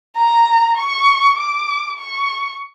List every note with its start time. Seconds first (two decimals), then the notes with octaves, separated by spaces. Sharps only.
0.16 A#5
0.76 C#6
1.36 D6
1.97 C#6